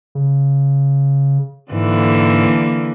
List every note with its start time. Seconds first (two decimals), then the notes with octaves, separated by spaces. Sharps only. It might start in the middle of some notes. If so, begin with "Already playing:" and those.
0.15 C#3
1.72 G#2 D3 E3 A#3